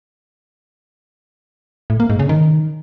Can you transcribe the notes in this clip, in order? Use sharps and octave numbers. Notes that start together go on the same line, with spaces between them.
A2
A#3
G#2
C#3
D#3